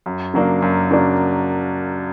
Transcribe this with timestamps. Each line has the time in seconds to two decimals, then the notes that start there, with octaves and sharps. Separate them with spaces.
0.06 F#2
0.34 C#3 F#3 A#3 D4
0.62 F#2
0.91 C#3 F#3 A#3 D4